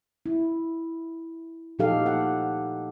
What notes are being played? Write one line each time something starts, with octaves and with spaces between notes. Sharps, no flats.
E4
A#2 F3 D#4 G4 A4 F5
F#5